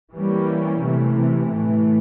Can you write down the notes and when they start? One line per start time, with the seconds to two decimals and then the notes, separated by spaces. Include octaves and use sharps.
0.13 E3 G3 A#3 C#4
0.82 C3 E3 A3
1.51 A2 E3 A3